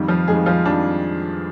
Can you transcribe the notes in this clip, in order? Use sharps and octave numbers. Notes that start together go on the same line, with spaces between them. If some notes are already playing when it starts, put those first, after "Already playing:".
Already playing: F2 D#3 G3
F3 F4
F2 D#3 G3 G#3 G#4
F3 F4
F2 D#3 G3 D4